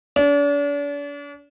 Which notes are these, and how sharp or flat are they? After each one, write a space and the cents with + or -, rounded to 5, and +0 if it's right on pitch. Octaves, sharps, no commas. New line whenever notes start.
D4 -40